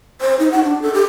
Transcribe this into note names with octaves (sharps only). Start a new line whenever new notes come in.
C5
D#4
F#5
D4
A4
G4